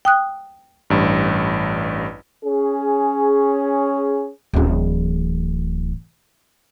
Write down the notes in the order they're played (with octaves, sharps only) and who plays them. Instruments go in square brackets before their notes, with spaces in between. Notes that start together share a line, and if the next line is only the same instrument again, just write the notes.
[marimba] G5 D#6 F#6
[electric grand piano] A1 G2
[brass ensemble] C#4 G#4
[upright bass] D1 E3